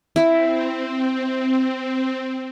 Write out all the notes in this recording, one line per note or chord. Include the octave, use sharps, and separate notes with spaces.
C4 E4 E5